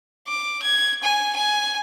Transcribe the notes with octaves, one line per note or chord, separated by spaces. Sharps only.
D6
G#6
G#5
G#5